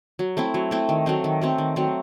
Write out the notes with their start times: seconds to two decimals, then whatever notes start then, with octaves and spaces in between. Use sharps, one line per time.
0.19 F#3
0.37 A3 C4 E4
0.54 F#3
0.71 A3 C4 E4
0.89 D#3
1.06 F#3 A3 C4
1.24 D#3
1.41 F#3 A3 C4
1.58 D#3
1.76 F#3 A3 C4